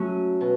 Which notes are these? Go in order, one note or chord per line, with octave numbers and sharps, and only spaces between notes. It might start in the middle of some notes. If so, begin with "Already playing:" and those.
Already playing: F#3 A3 C#4 F#4
B2